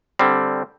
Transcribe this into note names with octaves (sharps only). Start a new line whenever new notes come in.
D3 G3 C4